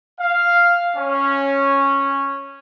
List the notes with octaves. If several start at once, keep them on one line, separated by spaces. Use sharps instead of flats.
F5
C#4